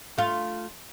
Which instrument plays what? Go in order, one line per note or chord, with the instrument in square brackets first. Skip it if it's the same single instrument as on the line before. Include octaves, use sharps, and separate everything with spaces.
[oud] A3 F4